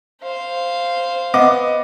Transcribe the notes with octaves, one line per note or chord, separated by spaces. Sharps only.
C5 F5
B3 D#5 D6